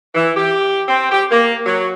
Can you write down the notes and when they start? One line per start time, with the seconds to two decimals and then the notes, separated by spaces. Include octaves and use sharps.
0.15 E3
0.36 G4
0.88 C4
1.11 G4
1.31 A#3
1.66 F#3